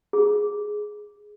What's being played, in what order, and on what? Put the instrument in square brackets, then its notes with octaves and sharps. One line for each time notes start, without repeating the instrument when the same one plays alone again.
[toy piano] G#4